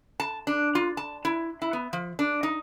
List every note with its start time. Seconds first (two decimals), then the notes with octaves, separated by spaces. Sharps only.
0.20 A5
0.47 D4
0.75 F4
0.97 A5
1.25 E4
1.62 E4
1.73 B3
1.93 F3
2.19 D4
2.43 D#4